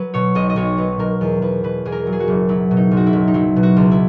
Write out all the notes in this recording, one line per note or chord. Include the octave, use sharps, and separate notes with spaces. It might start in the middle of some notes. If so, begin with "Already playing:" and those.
Already playing: F#3 B4
B2 C#5
B1 D#5
D#5
B1 C#5
F#3 B4
B2 A#4
E2
E2 B4
B2 B4
E2 G#4
A#4
F#3
G#4
F#4
F#1
F#3 E4
B2
D#4
B1
F#4
E4
B1
D#4
F#3 E4
B2
F#4
C#2
E4